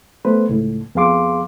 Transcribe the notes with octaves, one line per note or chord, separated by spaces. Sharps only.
A3 B3 B4 C5
C#2 A2
F2 B3 G#4 F5 C6 D6